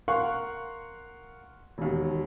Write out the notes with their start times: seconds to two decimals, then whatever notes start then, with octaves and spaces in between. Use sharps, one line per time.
0.08 A#4 F5 F#5 C6 C#6 F#6
1.78 E1 D#2